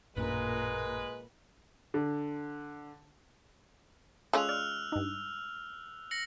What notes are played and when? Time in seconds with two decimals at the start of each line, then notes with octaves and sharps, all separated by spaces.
0.16 A1 F#2 A#2 G#3 D4 A#4 B4
1.94 D3
4.33 G#3 C#4 F4 A4 E6 F#6 F7
4.49 D5 F6
4.92 G2 D#4
6.11 A#6 C#7 F#7